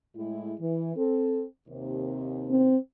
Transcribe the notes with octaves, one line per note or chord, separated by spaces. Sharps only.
A2 G#3 E4
E3
C4 A4
D#2 C3
C4